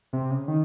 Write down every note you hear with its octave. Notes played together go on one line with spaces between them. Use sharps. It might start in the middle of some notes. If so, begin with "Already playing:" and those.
C3
C#3
D#3